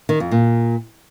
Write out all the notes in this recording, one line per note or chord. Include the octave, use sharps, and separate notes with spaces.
D#3
F2
A#2